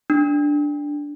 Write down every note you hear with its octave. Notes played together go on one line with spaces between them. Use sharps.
D4